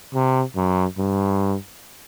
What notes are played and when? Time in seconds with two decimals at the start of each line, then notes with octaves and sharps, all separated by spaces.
0.14 C3
0.56 F#2
0.98 G2